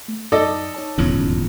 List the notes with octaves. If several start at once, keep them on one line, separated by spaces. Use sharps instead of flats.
A3
F#2 D#4 A4 D5 D#5 D#6
D#4 C#5 A5
D#1 E2 G#2 D3 C#4 F4